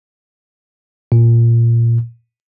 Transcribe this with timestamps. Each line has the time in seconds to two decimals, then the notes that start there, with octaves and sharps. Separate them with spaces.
1.12 A#2